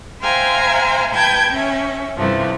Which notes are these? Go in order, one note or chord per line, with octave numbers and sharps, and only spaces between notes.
C5 E5 F5 G5 G#5 A#5
B4 G5 A5 G6 G#6
C#4 E5
G2 C3 E3 F3 A3